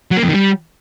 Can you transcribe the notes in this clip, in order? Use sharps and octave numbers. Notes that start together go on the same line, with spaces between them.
F#3
A#3
F2
D#3
G3